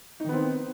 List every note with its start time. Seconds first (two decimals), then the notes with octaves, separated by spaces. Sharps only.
0.20 D#4
0.24 D#3
0.29 B3
0.33 C4